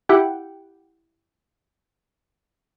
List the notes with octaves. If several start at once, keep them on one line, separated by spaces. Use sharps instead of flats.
E4 G4 F#5 G5